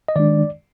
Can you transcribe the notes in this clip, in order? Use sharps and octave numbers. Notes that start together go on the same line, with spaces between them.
D#5
D#3 G#3 D4 D5